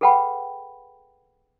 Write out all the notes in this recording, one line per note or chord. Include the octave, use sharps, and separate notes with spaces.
G#4 A4 B4 F#5 G5 B5